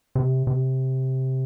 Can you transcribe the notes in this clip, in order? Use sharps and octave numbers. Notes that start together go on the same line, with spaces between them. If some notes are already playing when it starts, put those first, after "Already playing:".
C3
C3